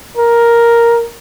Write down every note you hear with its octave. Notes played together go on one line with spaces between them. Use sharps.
A#4